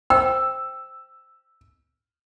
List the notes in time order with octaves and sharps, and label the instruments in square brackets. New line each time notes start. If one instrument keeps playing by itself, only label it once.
[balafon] C5 [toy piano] G5 [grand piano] E6